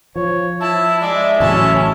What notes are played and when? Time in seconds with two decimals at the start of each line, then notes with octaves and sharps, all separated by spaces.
0.16 F3 C#5
0.61 E4 A5
1.01 G#3 D5 E5
1.40 A1 C#3 F#3 C#4 E4 A5